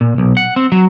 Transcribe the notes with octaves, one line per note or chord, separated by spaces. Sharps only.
A#2
B1
F#5
C4
F#3